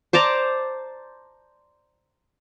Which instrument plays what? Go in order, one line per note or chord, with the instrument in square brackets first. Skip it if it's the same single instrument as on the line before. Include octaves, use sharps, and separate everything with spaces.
[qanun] C5 D5 A5 A#5